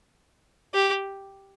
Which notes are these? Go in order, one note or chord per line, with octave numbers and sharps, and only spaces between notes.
G4